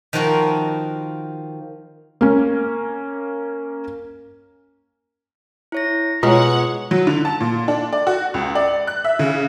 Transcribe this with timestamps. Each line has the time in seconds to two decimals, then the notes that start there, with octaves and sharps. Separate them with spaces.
0.13 D#3 F3 F4 F#4 A#4
2.21 A#3 C#4
5.72 E4 C#5 A#6
6.23 B2 G#3 F4 C#5 F#5 D#6
6.91 F#3
7.07 D3
7.25 A5
7.41 A#2
7.68 D4
7.93 D5
8.07 F#4
8.34 C#2
8.55 D5
8.87 F#6
9.04 E5
9.19 C#3